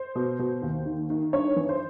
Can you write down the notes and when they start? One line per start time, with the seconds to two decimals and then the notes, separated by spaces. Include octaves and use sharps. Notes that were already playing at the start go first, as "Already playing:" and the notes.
Already playing: C5
0.15 B2
0.39 B2
0.62 D#2
0.86 D#3
1.10 D#3
1.33 G2 C#5
1.56 E3
1.69 C5